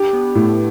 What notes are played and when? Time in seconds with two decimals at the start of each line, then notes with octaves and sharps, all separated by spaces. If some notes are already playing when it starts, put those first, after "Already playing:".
Already playing: D4 G4
0.13 B3
0.35 A2 A3